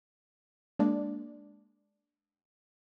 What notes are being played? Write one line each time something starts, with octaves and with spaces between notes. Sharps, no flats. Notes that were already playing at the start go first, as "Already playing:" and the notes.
G#3 A#3 D4 D5